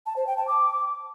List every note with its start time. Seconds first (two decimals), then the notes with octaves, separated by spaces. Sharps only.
0.06 A5
0.17 C5
0.27 G5
0.37 A5
0.47 D6